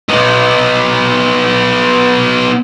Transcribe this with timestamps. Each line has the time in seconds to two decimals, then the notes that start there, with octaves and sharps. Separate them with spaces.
0.09 B3 D#4